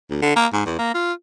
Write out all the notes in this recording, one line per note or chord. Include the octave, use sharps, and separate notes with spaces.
D2
D3
A#3
G#2
E2
A#3
F4